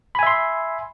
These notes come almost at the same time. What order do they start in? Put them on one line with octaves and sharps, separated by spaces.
B5 G#5 E5 C6